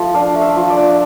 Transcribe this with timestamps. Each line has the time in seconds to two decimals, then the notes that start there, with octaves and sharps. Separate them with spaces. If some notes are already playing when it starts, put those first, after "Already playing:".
Already playing: F3 A3
0.14 D4 F5
0.35 A3
0.42 E5
0.56 F3
0.70 D5
0.76 D4